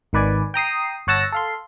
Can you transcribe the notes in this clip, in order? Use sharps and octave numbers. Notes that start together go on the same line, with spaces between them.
G#1 D#3 B4 D5 G#5
G5 A#5 D#6 C7
G1 C#5 F#5 A5 E6 A#6
A4 F5 C6